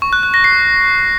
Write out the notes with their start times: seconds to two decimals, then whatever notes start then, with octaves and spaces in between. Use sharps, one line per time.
0.02 C#6
0.13 F#6
0.23 F#6
0.34 A#6
0.44 C7